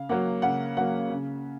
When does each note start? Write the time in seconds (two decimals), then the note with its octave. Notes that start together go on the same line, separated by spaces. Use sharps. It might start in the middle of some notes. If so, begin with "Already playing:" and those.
Already playing: C#3 F5
0.09 F#3 A#3 F#5
0.42 C#3 F#5
0.77 F#3 A#3 F#5
1.10 C#3